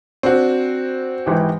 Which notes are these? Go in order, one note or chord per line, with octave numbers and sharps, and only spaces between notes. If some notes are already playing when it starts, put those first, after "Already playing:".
C4 D4 F#4
G#1 E3 G4